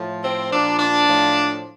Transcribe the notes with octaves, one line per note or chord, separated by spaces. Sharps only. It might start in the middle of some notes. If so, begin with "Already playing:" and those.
Already playing: A2 F3
C4
A#2 F3 D4
D4
A2 F3